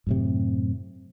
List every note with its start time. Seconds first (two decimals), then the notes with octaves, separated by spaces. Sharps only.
0.07 F#2 A2 C3